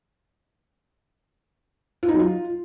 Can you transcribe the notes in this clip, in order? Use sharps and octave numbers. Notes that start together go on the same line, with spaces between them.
F4
D#4
F#3
F4